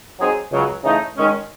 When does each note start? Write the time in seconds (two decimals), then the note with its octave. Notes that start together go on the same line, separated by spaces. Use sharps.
0.20 F#3 C4 D#4 G#4
0.52 C#2 C#3 F#3
0.84 C#3 E3 A3 D#4
1.16 D#3 G#3 C#4